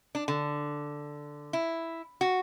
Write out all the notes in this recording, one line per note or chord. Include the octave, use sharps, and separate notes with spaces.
D4
D3
E4
F#4